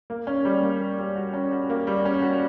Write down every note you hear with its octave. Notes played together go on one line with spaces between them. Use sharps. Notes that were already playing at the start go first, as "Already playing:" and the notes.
A#3
C#4
G3
A#3
A#3
G3
F#4
C#4
F#4
A#3
G3
C#4
F#4